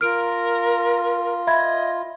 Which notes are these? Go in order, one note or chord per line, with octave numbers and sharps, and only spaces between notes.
F4 A#4 F6 D7
D#5 E5 B5 G#6